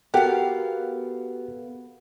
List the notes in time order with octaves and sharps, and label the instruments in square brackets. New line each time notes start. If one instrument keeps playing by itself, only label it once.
[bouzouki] B3 F5 [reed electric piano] F#4 G4 A4 [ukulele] A#4 G5